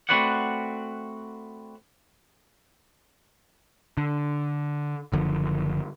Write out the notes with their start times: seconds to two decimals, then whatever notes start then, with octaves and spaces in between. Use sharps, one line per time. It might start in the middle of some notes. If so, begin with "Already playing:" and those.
0.09 A3 C4 F#4 B4 D5 F#5
3.97 D3
5.12 F#1 D3 F3